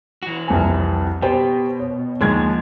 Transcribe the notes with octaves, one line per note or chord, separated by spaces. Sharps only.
E3 F#4
C2 F2 G#5
B2 G4 C5 G5
C#5
D#2 D3 F3 G#3 G#6